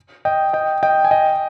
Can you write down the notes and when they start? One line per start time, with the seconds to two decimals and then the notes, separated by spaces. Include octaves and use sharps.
0.25 D#5 G5
0.53 D#5 G5
0.83 D#5 G5
1.05 G#5
1.11 D#5 G5